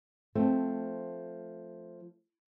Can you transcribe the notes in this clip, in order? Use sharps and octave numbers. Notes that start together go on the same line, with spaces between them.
F3 A3 C4